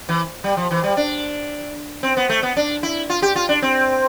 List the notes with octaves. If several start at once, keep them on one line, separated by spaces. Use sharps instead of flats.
E3
G3
F3
E3
G3
D4
C4
B3
A3
B3
D4
E4
F4
G4
F4
D4
C4